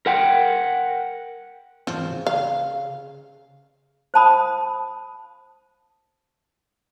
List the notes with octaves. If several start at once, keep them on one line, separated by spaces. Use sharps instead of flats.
A#4 F#5 G5
G#2 E3 F3 C4
C#3
F5
C5 F5 A5 B5 D#6